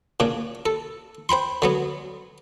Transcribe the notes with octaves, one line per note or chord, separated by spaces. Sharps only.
A#2 C#3 D4
A4
C5 G5 B5 C6
D3 F#3 B3